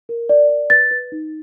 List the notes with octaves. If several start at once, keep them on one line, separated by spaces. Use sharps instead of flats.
A#4
D5
D5
B4 A6
B4
D#4